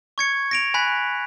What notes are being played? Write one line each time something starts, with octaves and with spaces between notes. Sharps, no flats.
C#6 G#6 C#7
A#6 D7 F7
G#5 B5 F#6 B6